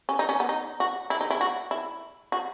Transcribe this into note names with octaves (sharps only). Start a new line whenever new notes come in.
C#4
D#4
C#4
B3
D#4
F#4
E4
D#4
E4
F#4
E4
F#4